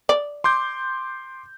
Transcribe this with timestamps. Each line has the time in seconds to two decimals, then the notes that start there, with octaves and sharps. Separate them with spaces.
0.09 D5
0.44 C6 D6 G6